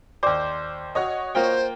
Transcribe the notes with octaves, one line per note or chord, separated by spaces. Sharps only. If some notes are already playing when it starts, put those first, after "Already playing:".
D#2 C5 D5 D6
F#4 C#5 D#5
A#3 F4 C5 G5